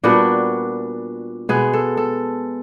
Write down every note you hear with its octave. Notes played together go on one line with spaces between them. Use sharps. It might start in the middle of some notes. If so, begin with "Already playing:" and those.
A#2 G3 B3 D4 F#4
B2 G#3 B3 G#4
A4
A4